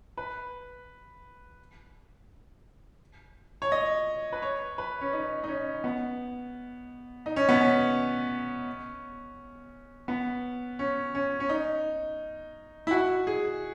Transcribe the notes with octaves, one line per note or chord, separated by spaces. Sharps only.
B4
C#5
D#5
B4
C#5
B4
C#4
D#4
D#4
C#4
B3
D#4
C#4
B3
C#4
B3
C#4
C#4
C#4
D#4
E4
F#4
G#4